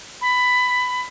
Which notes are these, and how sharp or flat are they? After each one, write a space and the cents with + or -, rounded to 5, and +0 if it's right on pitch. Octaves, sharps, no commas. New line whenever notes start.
B5 +15